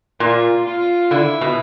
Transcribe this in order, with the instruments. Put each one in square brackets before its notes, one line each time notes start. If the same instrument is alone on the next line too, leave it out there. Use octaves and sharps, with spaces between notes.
[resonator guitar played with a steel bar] A#2 [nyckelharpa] F4
[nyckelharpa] F4
[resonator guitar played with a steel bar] D3 [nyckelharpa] E4
[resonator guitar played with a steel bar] B2